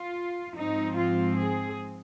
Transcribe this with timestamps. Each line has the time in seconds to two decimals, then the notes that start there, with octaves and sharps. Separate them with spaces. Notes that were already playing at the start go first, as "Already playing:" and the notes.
Already playing: F4
0.55 G#2 F3 C4 D#4
0.96 F4
1.36 G#4